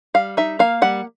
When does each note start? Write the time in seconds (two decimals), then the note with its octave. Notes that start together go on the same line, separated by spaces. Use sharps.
0.14 G3 F5
0.37 D#4 E5
0.59 A#3 F5
0.82 G3 F#5